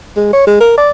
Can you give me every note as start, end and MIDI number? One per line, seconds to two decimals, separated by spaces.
0.16 0.32 56
0.33 0.43 73
0.47 0.59 56
0.60 0.73 70
0.78 0.91 74